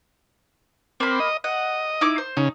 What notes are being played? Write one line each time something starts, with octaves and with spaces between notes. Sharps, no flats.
A#3 C4 B5
D#5
D#5 F#5
D#4 E4 D6
C5
C#3 D#4